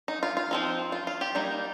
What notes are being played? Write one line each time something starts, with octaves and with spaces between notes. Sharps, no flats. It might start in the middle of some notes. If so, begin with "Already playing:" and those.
D#4
F4
F4
F3 C4 D#4
F4
F4
G4
G3 A#3 D#4